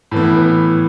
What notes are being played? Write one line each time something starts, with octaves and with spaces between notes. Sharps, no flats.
A2 E3 B3